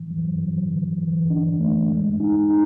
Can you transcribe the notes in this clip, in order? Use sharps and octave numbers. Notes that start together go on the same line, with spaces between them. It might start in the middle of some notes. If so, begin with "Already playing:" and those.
Already playing: E3
F#3
F#3
D3
E3
D4
A3
G#3
D#4
D#4